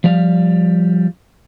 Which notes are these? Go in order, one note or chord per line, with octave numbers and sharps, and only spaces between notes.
F3 G3 F5